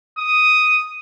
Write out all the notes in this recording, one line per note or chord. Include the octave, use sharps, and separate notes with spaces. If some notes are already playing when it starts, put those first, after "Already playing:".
D#6